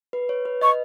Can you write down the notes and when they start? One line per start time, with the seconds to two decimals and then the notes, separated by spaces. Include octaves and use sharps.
0.13 B4
0.29 C#5
0.45 B4
0.61 D#5 C#6